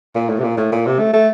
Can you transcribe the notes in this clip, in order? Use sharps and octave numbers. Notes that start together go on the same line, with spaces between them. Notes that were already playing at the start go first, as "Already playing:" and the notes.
A#2
A2
C3
A#2
A2
A#2
C3
A3
A3